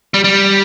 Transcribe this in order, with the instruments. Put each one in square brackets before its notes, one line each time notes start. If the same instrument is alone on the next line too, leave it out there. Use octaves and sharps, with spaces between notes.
[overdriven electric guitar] G3
G3